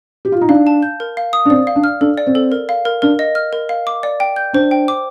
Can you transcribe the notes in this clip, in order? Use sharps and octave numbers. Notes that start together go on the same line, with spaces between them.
G4
F4
D#4
D4 F5
A5
G6
A#4
F5
D#6
D4
C4 D5
F5
D4
F6
D4 A4
D5
C4
A4
A#4
F5
A#4
D4 A#4
D#5
F6
A#4
F5
D6
D5
G5
G6
D4 C5
G5
D6